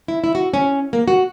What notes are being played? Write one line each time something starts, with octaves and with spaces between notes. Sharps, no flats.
E4
E4
F#4
C#4
A#3
F#4